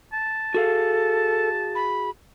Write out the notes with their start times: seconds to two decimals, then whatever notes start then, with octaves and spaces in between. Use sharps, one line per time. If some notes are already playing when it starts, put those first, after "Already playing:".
0.13 A5
0.54 F#4 G#4 A4 F5
1.75 B5